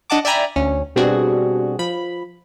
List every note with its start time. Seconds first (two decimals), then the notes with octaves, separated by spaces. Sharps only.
0.10 D4 D#5 F#5 A5 D6
0.25 D5 E5 G5 G#5 A#5 B5
0.56 D2 C#4
0.96 B2 G3 C4 D4 F#4 G#4
1.79 F3 B5